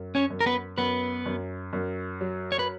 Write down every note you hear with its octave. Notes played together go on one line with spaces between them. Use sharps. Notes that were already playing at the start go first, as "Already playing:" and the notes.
Already playing: F#2
C#4 C#5
F#2
A#4
B3 B4
F#2 B3 B4
F#2
F#2
F#3
C#5
B4